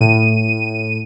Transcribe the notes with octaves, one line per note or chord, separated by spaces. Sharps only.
A2 D#7